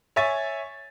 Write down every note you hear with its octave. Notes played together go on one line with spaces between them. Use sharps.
C#5 E5 G#5 C#6 A6